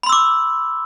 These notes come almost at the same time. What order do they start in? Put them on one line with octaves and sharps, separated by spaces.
B5 C6 E6 D6